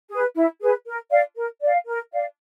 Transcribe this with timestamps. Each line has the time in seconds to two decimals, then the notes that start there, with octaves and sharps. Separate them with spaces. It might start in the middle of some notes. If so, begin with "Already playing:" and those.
0.10 G#4 B4
0.35 E4
0.61 G#4 B4
0.86 A#4
1.11 D5 F5
1.36 A#4
1.62 D5 F5
1.88 A#4
2.12 D5 F5